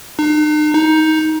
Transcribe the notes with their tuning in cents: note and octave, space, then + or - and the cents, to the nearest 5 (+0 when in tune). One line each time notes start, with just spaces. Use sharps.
D#4 -45
D#4 +15